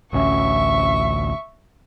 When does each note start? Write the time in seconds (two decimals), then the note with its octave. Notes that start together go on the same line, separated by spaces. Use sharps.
0.13 A1 D2 C#4 E5 C#6